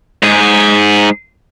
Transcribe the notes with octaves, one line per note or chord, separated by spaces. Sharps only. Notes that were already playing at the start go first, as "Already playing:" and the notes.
G#2 G#4